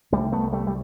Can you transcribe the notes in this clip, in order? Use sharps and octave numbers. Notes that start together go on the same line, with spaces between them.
C2 G3 A3
A3 B3
C2
G3 A3
G3